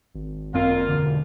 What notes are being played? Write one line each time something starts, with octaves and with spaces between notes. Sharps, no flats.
G#1
F#2 A#3 C4 F4
E1 D3